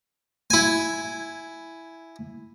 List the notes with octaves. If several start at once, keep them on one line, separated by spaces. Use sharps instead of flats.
E4 G#5